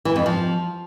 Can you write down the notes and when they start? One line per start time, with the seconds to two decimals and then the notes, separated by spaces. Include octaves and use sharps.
0.05 E3
0.16 F2
0.26 F3